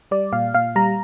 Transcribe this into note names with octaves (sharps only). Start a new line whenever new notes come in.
G3 D5
A#2 F5
A#2 F5
G3 A#5